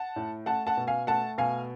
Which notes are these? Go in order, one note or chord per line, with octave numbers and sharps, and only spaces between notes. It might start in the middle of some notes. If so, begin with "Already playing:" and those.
Already playing: F#5 A5
A2
A3 F#5 A5
F#5 A5
B2
F5 G#5
A3 F#5 A5
B2 F5 G#5